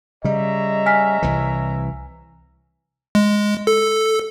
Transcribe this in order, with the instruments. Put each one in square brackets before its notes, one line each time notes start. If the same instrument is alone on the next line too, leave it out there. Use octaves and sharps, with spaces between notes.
[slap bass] C#3 G3 [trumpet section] C#5 E5 A#5 [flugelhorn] D#5
[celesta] G#5 F6 B6
[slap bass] C2 E3
[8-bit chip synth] G#3
A4